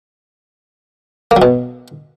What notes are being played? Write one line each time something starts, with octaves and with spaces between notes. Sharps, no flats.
A#3
F#3
B2